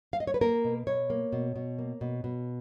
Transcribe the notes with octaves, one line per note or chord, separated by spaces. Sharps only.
F5
D#5
C#5
B4
A#3 A#4
B2
B2 C#5
A#3
B2
B2
A#3
B2
B2